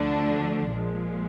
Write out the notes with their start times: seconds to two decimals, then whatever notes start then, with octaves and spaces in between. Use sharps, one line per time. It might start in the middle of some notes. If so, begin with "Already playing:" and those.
Already playing: D2 D3 F3 A3 D4
0.71 A#1 A#2 F3 G#3